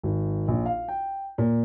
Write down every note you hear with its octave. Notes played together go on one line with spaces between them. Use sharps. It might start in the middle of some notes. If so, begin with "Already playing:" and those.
G#1
A#1
F5
G5
A#2